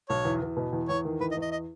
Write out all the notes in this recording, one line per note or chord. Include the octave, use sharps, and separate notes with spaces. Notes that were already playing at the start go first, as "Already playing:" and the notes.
B1 C#5
E2
E2
B2
E2
E2 C#5
D#3
E2 B4
D#5
E2
D#5
D#5